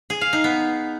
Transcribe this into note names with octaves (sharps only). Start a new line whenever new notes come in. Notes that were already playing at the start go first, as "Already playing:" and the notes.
G#4
F5
D#4
B3